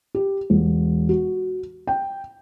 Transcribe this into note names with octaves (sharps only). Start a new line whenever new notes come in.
G4
E1
F#4
G5